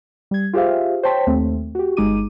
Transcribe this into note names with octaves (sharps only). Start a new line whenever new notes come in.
G3 G#6
F4 G4 G#4 C5 E5 F5
C5 C#5 G5 A5 C6 B6
D#2 A3 C4
F#4 G4
G1 G#3 D#4 D6 D#7